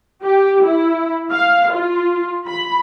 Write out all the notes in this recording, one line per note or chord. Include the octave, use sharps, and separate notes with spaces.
G4
E4
F5
F4
B5